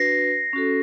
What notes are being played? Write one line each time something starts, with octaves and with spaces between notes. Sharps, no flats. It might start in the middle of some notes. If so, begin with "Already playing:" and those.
Already playing: D4 F#4 B4 A#6 C7
C#4 F#4 A4